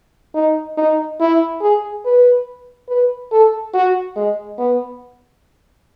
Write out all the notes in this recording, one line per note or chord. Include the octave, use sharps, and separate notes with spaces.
D#4
D#4
E4
G#4
B4
B4
A4
F#4
G#3
B3